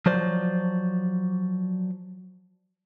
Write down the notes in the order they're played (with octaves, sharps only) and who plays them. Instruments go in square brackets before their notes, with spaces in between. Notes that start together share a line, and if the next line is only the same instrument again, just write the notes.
[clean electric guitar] F3 F#3 C5 D5